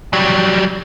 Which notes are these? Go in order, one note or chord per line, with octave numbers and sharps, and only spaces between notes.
F#3 G3